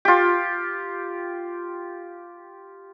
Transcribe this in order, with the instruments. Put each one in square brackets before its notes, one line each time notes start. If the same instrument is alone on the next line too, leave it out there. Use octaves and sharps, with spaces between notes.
[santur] F4 G4